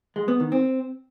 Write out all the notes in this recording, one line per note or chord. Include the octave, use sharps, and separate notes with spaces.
G#3
B3
D#3
C4